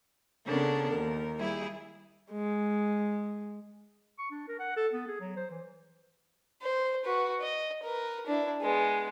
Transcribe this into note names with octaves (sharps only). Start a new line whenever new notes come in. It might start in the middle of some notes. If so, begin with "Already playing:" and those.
C#3 B3 D4 A4 A#4
D#2 A#4
G3 E4 G#4
G#3
C#6
D4
A#4
F#5
A4
B3
G#4
F#3
C5
E3
C5
F#4 B4
D#5
A#4 B4
D4 E4
G#3 B3